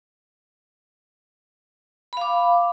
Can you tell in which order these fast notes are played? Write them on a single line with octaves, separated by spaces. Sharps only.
B5 F5 D6